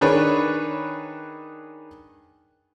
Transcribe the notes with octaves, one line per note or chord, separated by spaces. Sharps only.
D#3 D4 G#4 B4 C#5